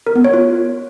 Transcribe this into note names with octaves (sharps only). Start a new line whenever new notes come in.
A#4
B3
C#5
F4